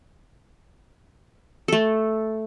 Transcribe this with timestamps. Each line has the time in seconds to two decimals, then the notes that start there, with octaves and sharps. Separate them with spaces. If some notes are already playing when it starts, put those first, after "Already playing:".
1.68 A3 A4